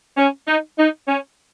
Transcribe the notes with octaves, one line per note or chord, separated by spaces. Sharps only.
C#4
D#4
D#4
C#4